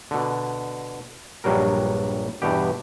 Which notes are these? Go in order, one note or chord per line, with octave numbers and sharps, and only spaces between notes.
B2 D3
A#1 G2 F#3 G3 A#4
E2 G2 B2 G4